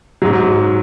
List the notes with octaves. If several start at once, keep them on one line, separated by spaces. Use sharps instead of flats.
G#2 F#3